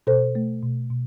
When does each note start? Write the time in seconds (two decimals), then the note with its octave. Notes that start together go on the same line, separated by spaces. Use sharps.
0.07 B2 A4 C5
0.35 A3
0.62 B2
0.91 B2